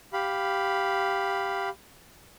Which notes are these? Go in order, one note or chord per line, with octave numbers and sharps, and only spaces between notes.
G4 F5 B5